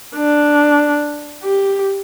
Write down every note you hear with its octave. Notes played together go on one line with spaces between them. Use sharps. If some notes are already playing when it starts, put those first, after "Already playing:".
D4
G4